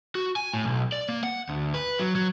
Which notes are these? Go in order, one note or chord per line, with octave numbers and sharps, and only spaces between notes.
F#4
G#5
A2
B1
D5
A#3
F#5
D2
B4
F#3
F#3